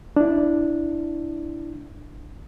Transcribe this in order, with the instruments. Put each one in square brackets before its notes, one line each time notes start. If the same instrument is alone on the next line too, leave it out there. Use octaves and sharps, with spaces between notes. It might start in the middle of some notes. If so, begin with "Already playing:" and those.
[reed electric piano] D4 E4